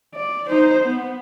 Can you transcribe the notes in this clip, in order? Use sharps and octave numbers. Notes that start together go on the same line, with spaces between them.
D5
D#4 C5
B3